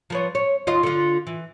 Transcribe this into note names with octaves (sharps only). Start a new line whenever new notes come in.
F3 B3 C#5
C#5
D#2 F4 D#5
D3 F4
E3